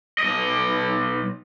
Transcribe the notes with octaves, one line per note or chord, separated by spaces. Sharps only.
B1 D#5